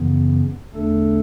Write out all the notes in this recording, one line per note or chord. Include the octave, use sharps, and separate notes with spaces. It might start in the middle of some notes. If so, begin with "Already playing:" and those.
Already playing: F#2 C#3 E3 B3
E2 D3 A3 D4 A4